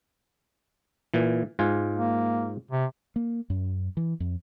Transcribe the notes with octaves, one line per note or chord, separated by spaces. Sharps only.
A#2 E3
G#2 F4 G#5
A#3
C3
A#3
F#2
E3
F2